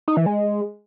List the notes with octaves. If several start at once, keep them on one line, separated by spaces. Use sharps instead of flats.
D#4
E3
G#3